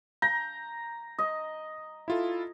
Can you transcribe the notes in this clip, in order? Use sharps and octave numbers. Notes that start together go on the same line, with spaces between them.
A#5 G6
D#5
E4 F4 A4